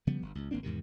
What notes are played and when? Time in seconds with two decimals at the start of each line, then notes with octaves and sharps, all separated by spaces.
0.07 C#3 F3 G3 B3
0.22 G1
0.35 C#2
0.51 G#1 A#3 C4 D4
0.63 E2 G#2 C3 D#3